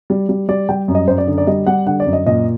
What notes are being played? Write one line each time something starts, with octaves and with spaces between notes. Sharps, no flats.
G3
G3
G3 D5
G3 G5
F#2
D#5
F#2 C5
D5
D3
D5
G3 D#5
G3 F#5
D3 F#5
D5
F#2
D#5
A#2 D#5